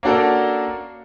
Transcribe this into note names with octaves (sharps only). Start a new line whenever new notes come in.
A#3 C#4 D4 F#4 A4 A#4